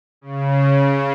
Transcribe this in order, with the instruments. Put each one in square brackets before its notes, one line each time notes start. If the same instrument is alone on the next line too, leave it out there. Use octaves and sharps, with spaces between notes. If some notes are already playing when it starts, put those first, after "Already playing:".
[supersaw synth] C#3